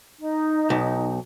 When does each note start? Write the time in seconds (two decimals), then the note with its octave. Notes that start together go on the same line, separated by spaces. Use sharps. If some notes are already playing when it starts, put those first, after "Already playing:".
0.19 D#4
0.70 B1